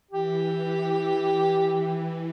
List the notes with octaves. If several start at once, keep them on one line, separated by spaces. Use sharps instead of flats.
E3 G4